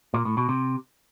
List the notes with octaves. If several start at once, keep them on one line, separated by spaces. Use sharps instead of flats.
A#2
A2
B2
C3